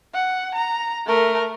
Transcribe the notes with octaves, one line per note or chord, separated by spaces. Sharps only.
F#5
A#5
A3 A#4